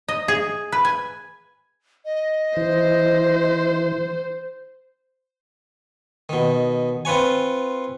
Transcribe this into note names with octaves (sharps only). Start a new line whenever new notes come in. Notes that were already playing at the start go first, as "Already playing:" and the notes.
D#5
G#4
B4
G#5
D#5
E3 C5
B2 D#3
C4 F4 B4 C#5 G#5